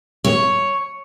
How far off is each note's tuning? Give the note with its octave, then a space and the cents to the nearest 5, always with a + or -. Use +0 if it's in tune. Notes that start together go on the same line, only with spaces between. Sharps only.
C#5 +0